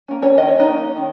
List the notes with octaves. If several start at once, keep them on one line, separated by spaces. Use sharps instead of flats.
A#3 C#4
C#4 C#5
D#3 D#5
C#5
D#4 D#5
A#3 C#4
D#3